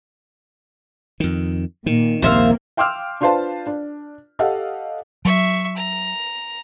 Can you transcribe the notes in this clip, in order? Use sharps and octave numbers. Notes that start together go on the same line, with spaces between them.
F2 D#3
A#2 D#3
A#1 D#2 G#2 C3 A#3 C5 E5 F5
F5 G5 C6 D6 E6 F6
D4 F4 B4 C5 F5 A5
D4
G4 A4 D#5 F5 F#5
F#3 E5 C#6
A#5